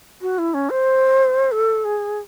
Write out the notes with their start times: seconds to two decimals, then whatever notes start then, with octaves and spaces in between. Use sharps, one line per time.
0.22 F#4
0.38 E4
0.54 C#4
0.70 C5
1.52 A4
1.85 G#4